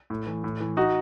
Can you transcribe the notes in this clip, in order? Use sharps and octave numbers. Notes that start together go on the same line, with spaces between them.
A2
E3
A2
E3
D#4 F#4